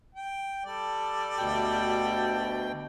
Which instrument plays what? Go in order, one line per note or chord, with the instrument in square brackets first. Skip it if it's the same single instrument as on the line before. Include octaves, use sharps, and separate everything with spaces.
[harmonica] G5
G3 A4 D5
[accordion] D2 B2 G5